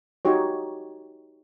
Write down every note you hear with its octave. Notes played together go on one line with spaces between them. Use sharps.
D#4 F#4 G4 C#5